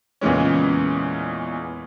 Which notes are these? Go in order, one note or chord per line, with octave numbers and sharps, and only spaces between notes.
E2 A#2 C#3 E3 G#3 C#4